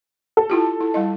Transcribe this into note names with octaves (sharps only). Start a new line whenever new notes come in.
A4
E4 F4 G4
E4
G3 E4 D#5